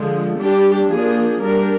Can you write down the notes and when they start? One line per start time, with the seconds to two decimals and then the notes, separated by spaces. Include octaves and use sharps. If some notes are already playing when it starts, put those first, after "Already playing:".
Already playing: D3 F3 G#3
0.37 G3 D4 G4
0.89 F3 A#3 D4 G#4
1.41 G3 D4 A#4